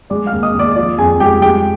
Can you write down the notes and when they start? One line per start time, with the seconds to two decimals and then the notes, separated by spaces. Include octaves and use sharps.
0.10 G#3 D5 D6
0.26 F5 F6
0.33 D#2
0.43 D#5 D#6
0.55 D#2 D5 D6
0.76 F3 D5 D6
0.98 F2 G#4 G#5
1.20 G#3 G4 G5
1.42 G#3 G4 G5